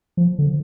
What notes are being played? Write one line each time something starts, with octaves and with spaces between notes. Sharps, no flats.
F3
D3